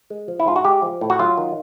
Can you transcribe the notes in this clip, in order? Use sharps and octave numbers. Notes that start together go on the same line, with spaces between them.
G#3
F3
E4
G#2 F4
F#4
G#3 G4
F3
A2
F#4
F#3 F4
D#3